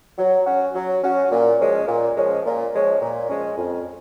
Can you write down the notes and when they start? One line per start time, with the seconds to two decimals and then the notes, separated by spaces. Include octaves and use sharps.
0.18 F#3
0.46 C#4 F#4
0.75 F#3
1.03 C#4 F#4
1.31 A#2
1.59 F3 G#3 C#4
1.88 A#2
2.17 F3 G#3 C#4
2.45 A#2
2.73 F3 G#3 C#4
3.01 A#2
3.29 F3 G#3 C#4
3.57 F2